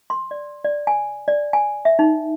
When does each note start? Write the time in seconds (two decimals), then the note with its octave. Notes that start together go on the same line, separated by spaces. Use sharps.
0.10 C6
0.31 D5
0.64 D5
0.87 G#5
1.28 D5
1.53 G#5
1.85 E5
1.99 D#4